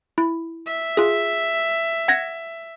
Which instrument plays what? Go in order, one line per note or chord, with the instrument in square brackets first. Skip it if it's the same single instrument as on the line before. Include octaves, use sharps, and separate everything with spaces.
[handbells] E4
[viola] E5
[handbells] F4 G#4
F#5 G#6 A#6